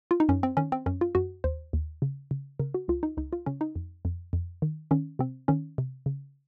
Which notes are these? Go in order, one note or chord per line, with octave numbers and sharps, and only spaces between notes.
F4
D#4
F#2 C#4
C4
D#3 C#4
C4
F#2 C#4
F4
F#2 F#4
D#2 C5
D#2
C#3
C#3
C#3 A#4
F#4
C#2 F4
D#4
C#2 D#4
F4
C#3 C#4
D#4
F2
F2
F2
D#3
D#3 C#4
C3 C4
D#3 C#4
C3
C#3